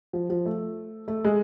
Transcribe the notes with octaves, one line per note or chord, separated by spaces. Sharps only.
F3
F3
A3
A3
G#3